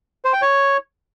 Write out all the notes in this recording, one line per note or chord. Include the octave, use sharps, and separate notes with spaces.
C5
G5
C#5